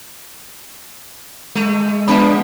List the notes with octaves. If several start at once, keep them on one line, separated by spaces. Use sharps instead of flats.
G#3 A3
F3 B3 D4 E5 A5 B5